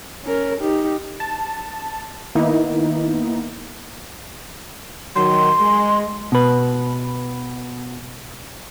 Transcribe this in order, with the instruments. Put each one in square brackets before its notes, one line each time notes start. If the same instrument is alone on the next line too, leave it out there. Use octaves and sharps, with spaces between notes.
[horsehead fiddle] C#4 A#4
D#4 G4
[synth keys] A5
D#3 A#3 B3 D#4 E4
[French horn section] D#3 F#3 [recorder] C6
[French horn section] G#3
[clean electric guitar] B2 B4